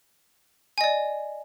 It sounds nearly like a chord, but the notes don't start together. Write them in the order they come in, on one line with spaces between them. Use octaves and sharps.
G#5 D#5 D5